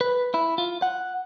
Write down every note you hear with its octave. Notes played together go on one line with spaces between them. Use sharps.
B4
E4
F4
F#5